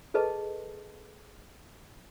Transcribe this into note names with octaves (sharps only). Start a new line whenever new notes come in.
G#4 A4 B4 D#5 A5